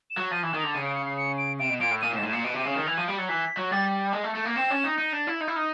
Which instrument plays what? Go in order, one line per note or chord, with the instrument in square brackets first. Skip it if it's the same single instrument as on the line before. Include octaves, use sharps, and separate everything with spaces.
[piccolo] E7
[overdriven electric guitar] F#3
[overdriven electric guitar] F3 [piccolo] D#7
[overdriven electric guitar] E3 [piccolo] E7
[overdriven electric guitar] D#3
[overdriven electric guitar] D3 [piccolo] F7
[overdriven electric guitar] C#3 [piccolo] D#7
[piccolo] D7
C#7
C7
C#7
D7
[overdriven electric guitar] C3 [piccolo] D7
[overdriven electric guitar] B2
[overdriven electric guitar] A#2 [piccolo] D7
[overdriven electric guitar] A2
[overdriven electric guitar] A#2 [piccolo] D#7
[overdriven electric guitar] A2
[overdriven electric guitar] G#2 [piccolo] E7
[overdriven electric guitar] A2
[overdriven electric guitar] A#2 [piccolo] E7
[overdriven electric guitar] B2 [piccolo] D7
[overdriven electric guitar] C3 [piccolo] D#7
[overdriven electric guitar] C#3
[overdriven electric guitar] D#3 [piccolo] E7
[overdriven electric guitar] E3 [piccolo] F7
[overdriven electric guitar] F3 [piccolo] D#7
[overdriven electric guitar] G3 [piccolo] D7
[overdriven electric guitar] F#3 [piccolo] C#7
[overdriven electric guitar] E3 [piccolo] B6
[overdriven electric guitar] F#3
[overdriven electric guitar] G3 [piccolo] A6
[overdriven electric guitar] G#3
A3
A3
A#3
[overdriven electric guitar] C4 [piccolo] E7
[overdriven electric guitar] C#4
D#4
[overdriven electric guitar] D#4 [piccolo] D#7
[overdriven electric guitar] D4
[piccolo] A6
[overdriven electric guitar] E4
[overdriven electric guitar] D#4 [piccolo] G6
[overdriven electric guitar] E4
[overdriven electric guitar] D#4 [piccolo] F6